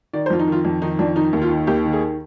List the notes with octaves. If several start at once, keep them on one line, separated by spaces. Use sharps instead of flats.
D#3 D5
C5
F2 F4
D#4
D#3 F4
F2
D#3 D#4
F2 D4
D#3 D#4
D#2
F4
D#3
D#2 G4
D#3
G#4